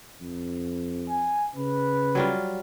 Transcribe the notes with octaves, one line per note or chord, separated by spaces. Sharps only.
F2
G#5
C#3 B4
F#3 G3 F4